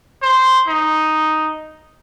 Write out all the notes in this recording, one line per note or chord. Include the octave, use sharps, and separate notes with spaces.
C5
D#4